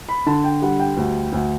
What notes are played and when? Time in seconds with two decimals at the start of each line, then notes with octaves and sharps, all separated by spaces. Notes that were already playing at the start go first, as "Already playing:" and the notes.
0.09 B5
0.26 D3 A5
0.44 G5
0.62 G3 F#5
0.79 G5
0.97 D2
1.33 D2